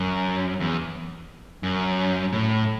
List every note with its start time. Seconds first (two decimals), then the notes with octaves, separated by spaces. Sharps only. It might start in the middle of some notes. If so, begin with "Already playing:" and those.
Already playing: F#2
0.60 E2
1.63 F#2
2.33 A2